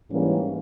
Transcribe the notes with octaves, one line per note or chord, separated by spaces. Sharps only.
G#2 E3 G3 A#3 C#4